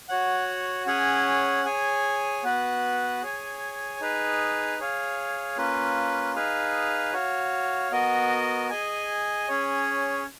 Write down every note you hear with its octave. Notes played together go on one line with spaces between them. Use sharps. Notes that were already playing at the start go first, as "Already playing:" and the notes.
F#4 C#5 F#5
C#4 G#4 C#5 F#5
G#4 C#5 G#5
B3 F#4 B4 F#5
G#4 C#5 G#5
D#4 G#4 B4
G#4 C#5 F5
A#3 C#4 F4 B4
D#4 G#4 B4 F5
F#4 C#5 F5
B3 F#4 A#4 D#5
G#4 D#5 G#5
C#4 G#4 C#5